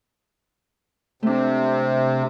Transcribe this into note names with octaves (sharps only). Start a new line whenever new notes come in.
C3 A3 D4